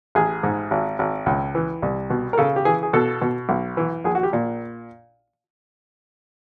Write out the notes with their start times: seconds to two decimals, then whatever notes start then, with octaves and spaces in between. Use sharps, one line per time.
0.15 A1 G#4
0.43 G#2
0.71 G#1
0.99 G#1
1.26 C#2
1.55 E3
1.82 C2
2.10 B2
2.33 A#4
2.38 C#3 A4
2.56 G4
2.65 E3 G#4
2.83 G#4
2.93 B2 A4
3.22 B2
3.49 B1
3.77 E3
4.04 A#1 G#4
4.15 F#4
4.23 G4
4.33 A#2